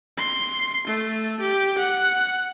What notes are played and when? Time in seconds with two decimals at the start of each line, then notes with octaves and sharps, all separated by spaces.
0.17 C6
0.87 A3
1.40 G4
1.78 F#5